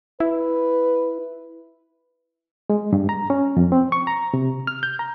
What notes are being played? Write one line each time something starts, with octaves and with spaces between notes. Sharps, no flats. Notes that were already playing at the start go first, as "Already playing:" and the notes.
E4 B4
G#3
G2
A#5
C#4
F2
C4
C#6
A#5
C3
F6
G6
A#5